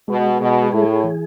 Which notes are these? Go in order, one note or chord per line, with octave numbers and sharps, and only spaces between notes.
B2 G#3
B2 G#4
A2 G#4
E3